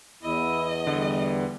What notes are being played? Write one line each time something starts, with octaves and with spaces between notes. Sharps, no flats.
E2 E4 D#5
D3 G3